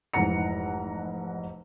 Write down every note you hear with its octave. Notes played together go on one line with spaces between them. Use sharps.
F1 G#2 E3 F#5 A#5 C#7